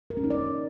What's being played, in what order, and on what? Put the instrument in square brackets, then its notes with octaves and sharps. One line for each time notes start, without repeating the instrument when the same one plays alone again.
[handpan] A#4
C#4
D#4
D5